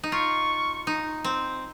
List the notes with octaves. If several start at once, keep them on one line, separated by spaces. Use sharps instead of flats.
D#4
F4 C#6
D#4
C4